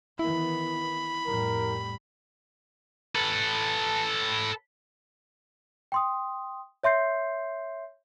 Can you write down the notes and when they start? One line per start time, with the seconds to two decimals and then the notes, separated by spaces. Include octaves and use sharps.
0.19 D#3 E3 B3 E4 B5
1.27 F2 A2 G3 A#4
3.16 A4 B4
5.92 G5 C6 D#6
6.84 C#5 E5 C6 G6 C7